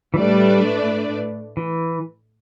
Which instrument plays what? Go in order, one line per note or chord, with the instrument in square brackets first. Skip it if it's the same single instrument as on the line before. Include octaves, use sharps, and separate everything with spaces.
[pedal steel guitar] E3
[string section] A2 A3 D4 B4 D5 [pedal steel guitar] G3
[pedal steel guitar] E3